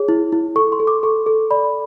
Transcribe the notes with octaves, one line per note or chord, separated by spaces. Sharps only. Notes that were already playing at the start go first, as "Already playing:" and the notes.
Already playing: G#4 C#5
E4
E4
A4 C#6
C6
A4
D6
A4 C#6
A4
D5 B5